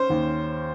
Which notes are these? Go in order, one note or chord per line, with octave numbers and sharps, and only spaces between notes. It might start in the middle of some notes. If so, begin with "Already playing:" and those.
Already playing: C#4 C5
D#2